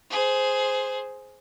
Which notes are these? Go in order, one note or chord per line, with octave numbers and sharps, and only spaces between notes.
G#4 C5